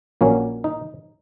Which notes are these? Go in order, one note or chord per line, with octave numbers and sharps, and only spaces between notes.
A#1 A#2 F#3 A#3 C#4
D#4